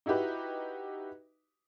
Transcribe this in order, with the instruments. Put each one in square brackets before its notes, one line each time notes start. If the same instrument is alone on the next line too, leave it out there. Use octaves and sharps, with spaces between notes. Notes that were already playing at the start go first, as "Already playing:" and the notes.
[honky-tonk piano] D#4 E4 F#4 G4 B4